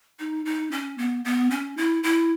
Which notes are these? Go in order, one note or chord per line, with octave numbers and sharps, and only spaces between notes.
D#4
D#4
C#4
B3
B3
C#4
E4
E4